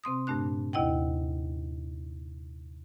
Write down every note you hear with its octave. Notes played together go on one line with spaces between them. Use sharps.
C3 C4 C6 D#6
G2 A#2 A3 D4 F#6
D#2 C3 E4 D#5 F#5 G5